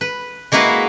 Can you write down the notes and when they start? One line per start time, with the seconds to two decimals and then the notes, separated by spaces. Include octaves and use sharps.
0.01 B4
0.52 G#3 A#3 E4 F#4 B4 F5